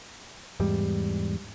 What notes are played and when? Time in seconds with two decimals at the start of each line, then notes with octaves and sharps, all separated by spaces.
0.60 E2 G#2 G3